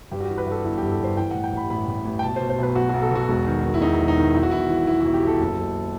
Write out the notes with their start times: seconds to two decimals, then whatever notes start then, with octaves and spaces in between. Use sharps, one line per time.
0.11 G2 G4
0.20 F#4
0.24 E3 G4
0.38 B4
0.46 G2 A4
0.64 G1 E4
0.78 G1 G4
0.91 A4
1.00 G1 C5
1.17 E3 G5
1.31 A2 F#5
1.44 G5
1.53 A1 B5
1.70 A1 B5
1.88 A2
2.05 A1
2.19 G5
2.23 B2 A5
2.36 C5
2.41 B2
2.50 C5
2.58 B1 B4
2.75 B1 F#4
2.89 B1 F#4
3.02 A4
3.11 B2 F#4
3.29 E1
3.46 D#3
3.64 D#3
3.74 E4
3.81 E1 D#4
4.00 E1
4.08 D#4
4.17 D#3
4.34 B1 E4
4.43 F#4
4.51 E3 E4
4.69 E3
4.87 B1 E4
5.01 B1 F#4
5.14 G4
5.23 B1 A4
5.40 F#1
5.58 F#1